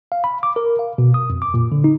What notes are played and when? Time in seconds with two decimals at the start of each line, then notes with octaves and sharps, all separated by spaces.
0.12 F5
0.24 B5
0.43 D6
0.56 A#4
0.79 F5
0.98 B2
1.14 D#6
1.30 F2
1.42 D6
1.54 A#2
1.72 D3
1.84 D#4